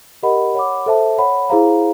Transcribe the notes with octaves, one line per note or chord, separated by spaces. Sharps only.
G4 A#4 D#5 F#5 B5
C#5 F#5 B5 D6
A4 C5 E5 A5
C#5 F#5 B5
E4 G#4 C5 F5 A#5